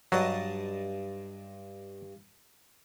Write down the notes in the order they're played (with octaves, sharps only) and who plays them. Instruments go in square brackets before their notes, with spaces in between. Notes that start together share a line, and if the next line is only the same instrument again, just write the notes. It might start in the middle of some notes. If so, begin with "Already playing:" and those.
[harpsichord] G2 D#5 A5 [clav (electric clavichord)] F#3